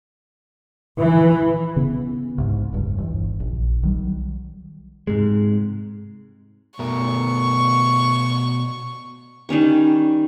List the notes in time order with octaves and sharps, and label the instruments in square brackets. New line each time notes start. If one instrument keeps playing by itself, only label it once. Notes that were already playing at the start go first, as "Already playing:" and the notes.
[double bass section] E3
[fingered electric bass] C#3 B3
C2 G#2
F1 C#2 G2
G1 E2
A#1
B1 D#3 F#3 G3
[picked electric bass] G#2 C3 G#3
[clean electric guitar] B2 A3 A#4 [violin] C#6
[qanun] D#3 G3 C#4 C#6